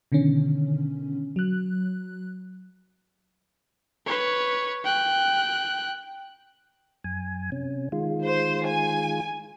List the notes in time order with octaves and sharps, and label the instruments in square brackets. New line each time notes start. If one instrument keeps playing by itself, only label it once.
[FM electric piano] B2 D3 D#3 C#4
F#3 F#6
[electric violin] B4 C#5
G5 F#6
[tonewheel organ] F#2 G#5
C3 C#4
D#3 G#3 F4
[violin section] C5
G#5